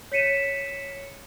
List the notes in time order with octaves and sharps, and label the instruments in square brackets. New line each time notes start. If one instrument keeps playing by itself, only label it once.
[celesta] C#5 B6 C#7 D#7 E7